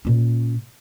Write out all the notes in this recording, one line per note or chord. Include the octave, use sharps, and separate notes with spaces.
A#2 C#4